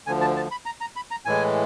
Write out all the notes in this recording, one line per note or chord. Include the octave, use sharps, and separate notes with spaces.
D2 D3 F3 G#5
A5
A5
B5
A#5
A#5
B5
A#5
A2 E3 G#3 G#5